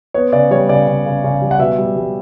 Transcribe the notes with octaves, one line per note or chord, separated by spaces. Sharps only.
B3 C#5
C#3 D5
G3 C#5
C#3 D5
C#3
C#3
C#3
G3
F#5
B2 E5
G3
G3